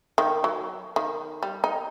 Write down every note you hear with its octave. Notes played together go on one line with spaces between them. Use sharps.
D#3
F#3
D#3
G3
D#4